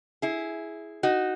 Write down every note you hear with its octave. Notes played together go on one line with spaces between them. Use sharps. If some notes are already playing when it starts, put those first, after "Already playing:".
E4 G#4
D#4 F#4